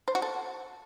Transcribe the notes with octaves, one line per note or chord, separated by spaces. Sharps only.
C5
F#4
A4